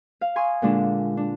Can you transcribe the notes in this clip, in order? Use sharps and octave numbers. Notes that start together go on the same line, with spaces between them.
F5
G#5 C6 C#6 D#6
A#2 D3 G#3 D4 F4
D4